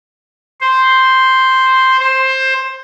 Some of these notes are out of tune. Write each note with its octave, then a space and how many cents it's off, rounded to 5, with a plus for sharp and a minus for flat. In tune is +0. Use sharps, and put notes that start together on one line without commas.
C5 +0
C5 +15